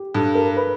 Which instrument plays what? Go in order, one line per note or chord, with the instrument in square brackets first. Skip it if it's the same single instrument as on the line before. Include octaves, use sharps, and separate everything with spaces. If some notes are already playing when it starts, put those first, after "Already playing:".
Already playing: [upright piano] G4
[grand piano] G2 [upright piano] A4
[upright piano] A#4
B4